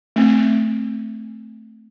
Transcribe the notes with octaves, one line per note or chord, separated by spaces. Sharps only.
A3 C4